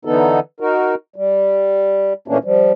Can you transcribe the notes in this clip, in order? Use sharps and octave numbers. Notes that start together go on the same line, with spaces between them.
D3 E3 B3 D#4 A4
D#4 F#4 A#4
G3
A#2 E3 A3 A#3 C#4 D4
F3 G3